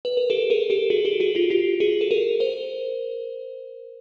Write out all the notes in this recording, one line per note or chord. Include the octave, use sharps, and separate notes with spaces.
B4
A#4
G4 A4
G#4 A#4
G4 A4
F#4 G#4
G4 A4
F#4 G#4
F4 G4
F4 G4
F#4 G#4
A4
G#4 A#4
A#4 C5